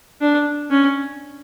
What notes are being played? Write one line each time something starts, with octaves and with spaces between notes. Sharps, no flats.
D4
C#4